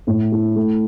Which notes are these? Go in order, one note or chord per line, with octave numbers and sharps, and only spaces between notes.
A2
E4
A3